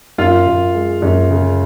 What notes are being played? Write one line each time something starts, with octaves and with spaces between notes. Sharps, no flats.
F#2 F4 F5
F#2
G#3
F#2
C#3